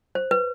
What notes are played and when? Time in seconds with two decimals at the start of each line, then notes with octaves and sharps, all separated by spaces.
0.15 C5
0.31 B4